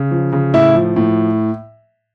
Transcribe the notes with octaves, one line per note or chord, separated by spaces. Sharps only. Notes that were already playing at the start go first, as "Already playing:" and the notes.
Already playing: C#3
F3
C#3
A2 E4 E5
F3
A2